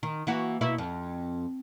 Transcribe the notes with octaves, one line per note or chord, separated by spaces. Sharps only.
D#3
E3 A#3 F#4
B2 A#3 E4
F2